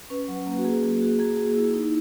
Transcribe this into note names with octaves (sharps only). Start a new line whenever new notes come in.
C#4 B4
F#3
A#3
F#4
A#3 G#4
A#3
F#4
A#3 G#4
A#3
E4
D#4